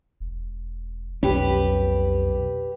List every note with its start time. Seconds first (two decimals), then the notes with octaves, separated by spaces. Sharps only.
0.20 E1
1.23 B1 F2 C#4 G4 B4